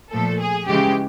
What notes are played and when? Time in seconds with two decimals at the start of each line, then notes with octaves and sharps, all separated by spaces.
0.11 A#2 F3 A3 A4
0.40 G#4
0.67 C#3 E3 G#3 G4